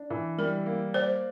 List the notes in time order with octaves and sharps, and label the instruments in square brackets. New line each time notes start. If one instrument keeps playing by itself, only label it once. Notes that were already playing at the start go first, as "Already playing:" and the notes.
Already playing: [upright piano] D4
E3
[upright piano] G3 [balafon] A#4
[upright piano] A#3
[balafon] C5 [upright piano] D5